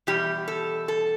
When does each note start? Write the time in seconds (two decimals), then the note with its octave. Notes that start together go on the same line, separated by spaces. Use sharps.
0.07 E2 B2 G3 G4
0.48 A4
0.88 A4